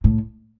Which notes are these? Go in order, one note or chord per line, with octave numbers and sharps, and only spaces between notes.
A2